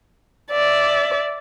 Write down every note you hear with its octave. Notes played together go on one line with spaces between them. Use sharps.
D5 E5